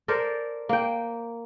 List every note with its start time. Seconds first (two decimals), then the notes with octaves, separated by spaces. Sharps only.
0.08 A4 A#4 C5 D5
0.69 A#3 G5